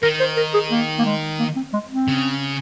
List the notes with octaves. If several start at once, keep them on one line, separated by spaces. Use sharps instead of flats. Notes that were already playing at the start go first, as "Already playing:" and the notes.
D#3 A#4
C5
A#4
G#4
A#3
A#3
G#3
A#3
C4
G#3
C4
C#3